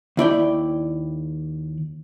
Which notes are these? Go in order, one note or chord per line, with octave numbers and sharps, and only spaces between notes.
D#2 E4 D5 G5